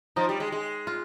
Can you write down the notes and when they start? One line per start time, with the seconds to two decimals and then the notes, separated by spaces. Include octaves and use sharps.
0.16 F3 D#4
0.29 G3
0.40 G#3
0.52 G#3
0.87 F4